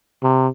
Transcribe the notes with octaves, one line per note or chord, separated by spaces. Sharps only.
C3